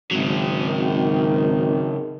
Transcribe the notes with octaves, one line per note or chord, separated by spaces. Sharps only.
G#1 C#3 F#3
D#3